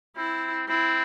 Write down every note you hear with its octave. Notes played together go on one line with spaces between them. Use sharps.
C4 E4
C4 E4